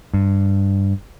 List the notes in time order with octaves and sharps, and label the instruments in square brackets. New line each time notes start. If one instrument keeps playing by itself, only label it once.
[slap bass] G2